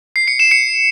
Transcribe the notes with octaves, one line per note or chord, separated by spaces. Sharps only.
C7
C#7
E7
C#7